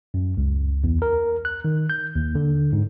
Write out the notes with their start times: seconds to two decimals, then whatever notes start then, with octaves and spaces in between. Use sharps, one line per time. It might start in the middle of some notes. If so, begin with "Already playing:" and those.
0.14 F#2
0.37 C#2
0.84 E2
1.02 A#4
1.45 F#6
1.65 D#3
1.90 G6
2.16 D#2
2.35 D3
2.73 G#2